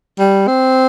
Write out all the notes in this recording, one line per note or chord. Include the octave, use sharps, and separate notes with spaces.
G3
C4